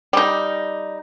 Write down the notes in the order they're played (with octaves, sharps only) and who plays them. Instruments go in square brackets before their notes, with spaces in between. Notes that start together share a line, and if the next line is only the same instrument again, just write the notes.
[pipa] G3 D#4